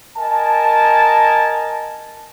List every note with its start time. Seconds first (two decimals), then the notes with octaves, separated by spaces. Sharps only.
0.17 A#4 D#5 G#5 A5